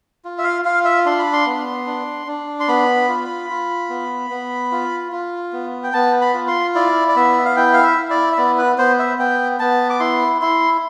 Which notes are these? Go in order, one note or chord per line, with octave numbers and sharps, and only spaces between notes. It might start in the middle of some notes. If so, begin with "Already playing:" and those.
F4
E5
F5
F4 F5
E5
D4 C6
B5
C6
B3
D4
D4
C6
B3 B5
F4
F4
B3
B3
F4
F4
B3
G5
B3 A5
B5
F4
C6
E4 D5
D5
B3 E5
F5
E4 G5
F5
E5
E4
D5
E5
B3 D5
B4
B3 C5
E5
B3 G5
B3 A5
D6
E4 C6
E4 C6